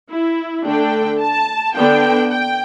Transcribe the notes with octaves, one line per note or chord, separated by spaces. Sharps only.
E4
D3 A3 D4 G5
A5
D3 B3 D4 G5
G5